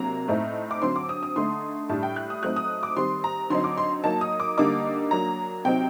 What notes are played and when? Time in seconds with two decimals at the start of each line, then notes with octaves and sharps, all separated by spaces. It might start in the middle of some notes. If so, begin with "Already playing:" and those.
Already playing: C3 F#3 A#3 D4 A#5
0.28 A2 A3 C4 D#4
0.71 D6
0.82 D3 F#3 C4 C6
0.96 D6
1.09 D#6
1.23 D#6
1.36 D3 A3 D#4 C6
1.89 A2 G3 D4 A5
2.03 G5
2.16 F#6
2.30 D#6
2.43 F#3 A3 C4 D#4 F#6
2.56 D#6
2.83 D6
2.96 D#3 G3 C4 C6
3.24 A#5
3.50 D3 F#3 C4 D#4 C6
3.64 D6
3.78 C6
4.04 F#3 A#3 D#4 A5
4.21 D#6
4.40 D6
4.57 D3 G3 A#3 D#4 D6
5.11 F#3 A#3 D4 A#5
5.65 C3 F#3 C4 D#4 G5